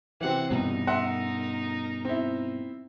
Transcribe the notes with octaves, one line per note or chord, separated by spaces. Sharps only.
C3 E3 C4 F#5
G2 B2 D#4 A#4
E5 F#5 C6
C4 E4